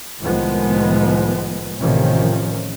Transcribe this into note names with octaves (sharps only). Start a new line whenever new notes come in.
C2 A2 D#3 F3 G#3 B3
A1 C3 D#3 F3 C#4